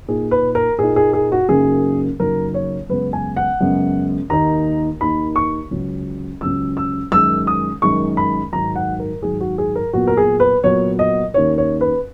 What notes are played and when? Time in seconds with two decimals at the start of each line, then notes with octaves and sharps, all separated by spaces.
0.08 A#2 A#3 D#4 G#4
0.31 B4
0.55 A#4
0.78 A#2 A#3 D#4 G#4
0.96 G#4
1.13 G#4
1.32 F#4
1.49 F#2 C#3 F#3 A#3 D#4 G#4
2.19 F#2 C#3 F#3 A#3 D#4 A#4
2.54 C#5
2.89 F#2 C#3 G#3 B3 B4
3.13 G#5
3.37 F#5
3.60 F#2 C#3 G#3 B3
4.30 D#2 D#3 A#3 D#4 A#5
5.01 D#2 D#3 A#3 D#4 B5
5.36 C#6
5.71 C#2 C#3 F#3 C#4
6.41 C#2 C#3 F#3 C#4 E6
6.77 E6
7.12 F#2 D#3 G#3 E6
7.47 D#6
7.82 F#2 D#3 G#3 C#6
8.17 B5
8.53 G#2 D#3 F#3 A#5
8.76 F#5
9.00 A#4
9.23 G#2 D#3 F#3 G#4
9.41 F#4
9.58 G#4
9.75 A#4
9.93 A#2 F#3 B3 F#4
10.07 A#4
10.17 G#4
10.40 B4
10.63 A#2 F#3 B3 C#5
10.99 D#5
11.34 D#2 D#3 A#3 C#4 C#5
11.58 C#5
11.81 B4